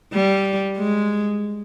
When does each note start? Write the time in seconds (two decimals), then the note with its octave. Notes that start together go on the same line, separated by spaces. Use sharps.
0.13 G3
0.78 G#3